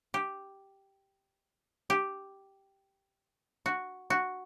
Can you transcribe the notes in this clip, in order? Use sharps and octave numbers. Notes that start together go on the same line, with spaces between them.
G4
G4
F#4
F#4